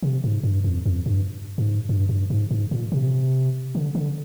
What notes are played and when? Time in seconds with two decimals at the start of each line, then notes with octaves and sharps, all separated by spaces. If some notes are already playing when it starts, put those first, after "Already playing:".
0.03 C3
0.24 G#2
0.43 G2
0.64 F2
0.86 F2
1.06 G2
1.58 G#2
1.89 G2
2.09 G2
2.30 G#2
2.51 G#2
2.71 A#2
2.92 C3
3.75 D3
3.95 D3